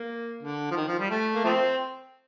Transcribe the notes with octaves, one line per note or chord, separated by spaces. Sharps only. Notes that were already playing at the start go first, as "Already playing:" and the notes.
Already playing: A#3
D3
F3
D#3
F3
G3
A3
A#3
F3 A3 C4